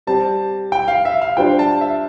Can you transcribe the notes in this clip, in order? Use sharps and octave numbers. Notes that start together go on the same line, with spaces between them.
G3 C4 G4 A5
G5
F5
E5
F5
G3 D4 F4 C5 G5
A5
E5